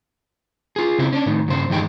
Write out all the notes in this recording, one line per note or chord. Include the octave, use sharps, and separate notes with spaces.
F4 G#4
C#3 C4 E4
C#4 D4
A2 D#3
G2 C#3 C5
E2 G2 D#3 G3 G#3 G5